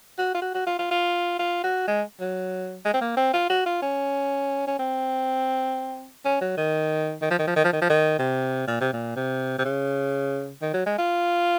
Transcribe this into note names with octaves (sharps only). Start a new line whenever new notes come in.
F#4
F4
F#4
F#4
F4
F4
F4
F4
F#4
G#3
F#3
G#3
C4
A#3
C4
F4
F#4
F4
C#4
C#4
C4
C#4
F#3
D#3
D#3
F3
D#3
F3
D#3
F3
D#3
F3
D#3
C3
A#2
C3
A#2
C3
C3
C#3
D#3
F#3
G#3
F4